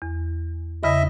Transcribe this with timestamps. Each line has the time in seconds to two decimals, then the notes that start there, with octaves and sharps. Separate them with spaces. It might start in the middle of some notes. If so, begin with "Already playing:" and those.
0.02 E2
0.83 E2 C#3 D#5 E5 B5